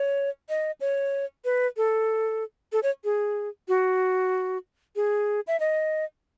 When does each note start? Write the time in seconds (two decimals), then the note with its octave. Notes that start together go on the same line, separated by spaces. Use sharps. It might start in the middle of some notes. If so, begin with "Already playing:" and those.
Already playing: C#5
0.49 D#5
0.81 C#5
1.45 B4
1.77 A4
2.72 A4
2.83 C#5
3.04 G#4
3.68 F#4
4.96 G#4
5.47 E5
5.60 D#5